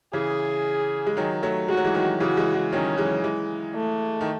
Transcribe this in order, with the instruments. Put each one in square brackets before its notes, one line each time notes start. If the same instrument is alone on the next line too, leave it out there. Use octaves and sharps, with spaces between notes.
[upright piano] C#3 E3 [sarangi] G#4
[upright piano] G#3
D#3 F#3
F#3 A3
[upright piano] G#3 [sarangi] F#4
[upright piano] F#3
E3 G#3
D#3 F#3
[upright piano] C#3 E3 [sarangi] F#4
[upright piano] E3 G#3
E3 G#3
[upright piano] D#3 F#3 [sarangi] C#4
[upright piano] E3 G#3
E3 G#3
[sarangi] A3
[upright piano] D#3